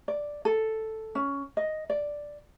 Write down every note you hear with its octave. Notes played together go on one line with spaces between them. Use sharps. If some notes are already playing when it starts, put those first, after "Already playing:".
D5
A4
C#4
D#5
D5